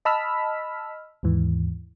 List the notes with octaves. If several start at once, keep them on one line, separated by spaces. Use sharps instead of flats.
D#5 A5 B5 E6 F6 B6
D#2 G#2 E3